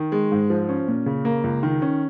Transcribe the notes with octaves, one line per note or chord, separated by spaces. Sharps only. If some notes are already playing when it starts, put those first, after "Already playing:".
Already playing: D#3
G#3
G#2
F3
C#4
A#2
C#3
A#3
C#2
D#3
C#4